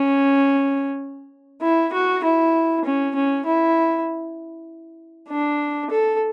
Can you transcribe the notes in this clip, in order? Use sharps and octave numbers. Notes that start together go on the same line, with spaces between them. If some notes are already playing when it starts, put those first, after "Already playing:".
Already playing: C#4
E4
F#4
E4
C#4
C#4
E4
D4
A4